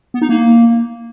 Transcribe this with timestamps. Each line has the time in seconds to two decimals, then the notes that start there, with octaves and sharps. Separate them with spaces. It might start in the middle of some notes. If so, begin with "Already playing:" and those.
0.14 B3
0.22 D#4
0.29 A#3